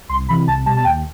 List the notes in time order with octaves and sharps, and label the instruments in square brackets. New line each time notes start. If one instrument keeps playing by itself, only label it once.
[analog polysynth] C2 C6
C3 E3 B5
C2 A5
B2 G3 A5
A5
D#2 G5